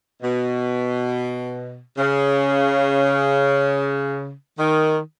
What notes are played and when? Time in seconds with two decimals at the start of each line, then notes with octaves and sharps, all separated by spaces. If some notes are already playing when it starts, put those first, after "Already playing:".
0.22 B2
1.97 C#3
4.59 D#3